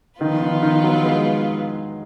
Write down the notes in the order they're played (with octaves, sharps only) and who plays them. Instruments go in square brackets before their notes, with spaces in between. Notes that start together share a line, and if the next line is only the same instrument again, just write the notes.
[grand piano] D#3 [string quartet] F3 B3 F4 B4
[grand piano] D#3
D#3
F#3
G#3